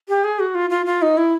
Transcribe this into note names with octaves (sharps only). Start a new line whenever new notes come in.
G4
G#4
F#4
F4
F4
F4
D#4
E4